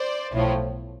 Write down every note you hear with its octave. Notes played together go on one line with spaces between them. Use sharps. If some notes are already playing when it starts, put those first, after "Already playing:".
Already playing: C5 D5
B1 A2 F3